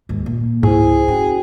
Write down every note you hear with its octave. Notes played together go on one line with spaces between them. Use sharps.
D#2 G#2
A#2
C#2 G#2 E4 G#4 C5
C#4 F#4 G5